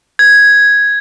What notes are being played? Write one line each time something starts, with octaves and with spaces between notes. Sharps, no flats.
G#6